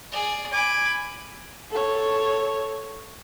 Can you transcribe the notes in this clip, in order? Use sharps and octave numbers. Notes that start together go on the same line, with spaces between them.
G#4 D5
G#5 B5 D6
A4 C#5